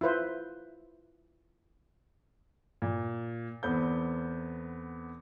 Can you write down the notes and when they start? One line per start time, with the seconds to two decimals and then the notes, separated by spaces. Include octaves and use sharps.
0.01 E4 F4 B4 C5
2.82 A#2
3.63 E2 B3 C4 A4 G6